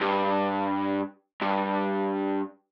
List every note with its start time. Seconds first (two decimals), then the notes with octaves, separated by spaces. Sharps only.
0.01 G2
1.41 G2